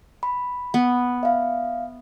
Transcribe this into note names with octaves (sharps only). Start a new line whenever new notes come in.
B5
B3
E5 F5